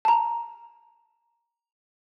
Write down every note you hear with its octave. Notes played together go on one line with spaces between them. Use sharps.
A5 A#5